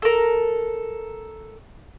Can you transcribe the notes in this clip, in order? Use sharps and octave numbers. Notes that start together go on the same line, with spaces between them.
A4 A#4